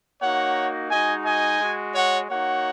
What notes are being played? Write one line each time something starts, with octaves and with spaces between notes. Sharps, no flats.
A#3 D#4 F#4 C#5 F#5
G#3 D#4 F#4 D#5 G#5
D#5 G#5
G#3 F#4
C#5 F#5
A#3 D#4 F#4 C#5 F#5